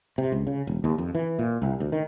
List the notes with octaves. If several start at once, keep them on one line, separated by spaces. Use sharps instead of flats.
C3
C#2
C#3
E1
D#2
F2
E3
A#2
C2
D2
D#3